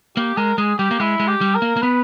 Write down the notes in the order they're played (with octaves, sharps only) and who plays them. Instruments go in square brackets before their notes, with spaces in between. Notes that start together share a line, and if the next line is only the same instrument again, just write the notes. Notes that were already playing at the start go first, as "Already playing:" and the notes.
[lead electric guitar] A#3 [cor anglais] G4
[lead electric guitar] G#3 [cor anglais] A#4
[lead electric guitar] G#3 [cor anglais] G#4
[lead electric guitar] G3 [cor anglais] G4
[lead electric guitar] A#3
[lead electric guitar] G#3 [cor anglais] E4
[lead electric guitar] G#3
[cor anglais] G4
[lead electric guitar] G3
[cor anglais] A#4
[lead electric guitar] A#3
A#3
[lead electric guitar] B3 [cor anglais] B4